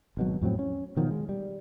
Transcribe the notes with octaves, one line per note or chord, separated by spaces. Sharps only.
G#1 B2 F#3
F2 A2 F#3 C4
C#4
B2 D#3 F3 F#3
G#3
G3